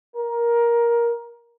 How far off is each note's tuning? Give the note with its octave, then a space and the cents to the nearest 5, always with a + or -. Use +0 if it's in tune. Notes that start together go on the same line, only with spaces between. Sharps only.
A#4 +15